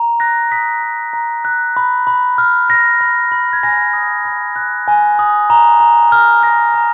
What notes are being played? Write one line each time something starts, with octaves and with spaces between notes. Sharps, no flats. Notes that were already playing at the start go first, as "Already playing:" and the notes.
Already playing: A#5
F#6 A#6
D#6 B6
A#5
A#5
F#6
B5
B5
F6
F6 A#6
B5
B5
G#6
G#5 A#6
D#6
B5
F#6
G#5
D#6
A#5
A#5
F6
F6 A#6
A#5